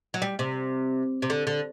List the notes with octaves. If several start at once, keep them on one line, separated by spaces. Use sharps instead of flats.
F#3
G3
C3
C3
D3
D3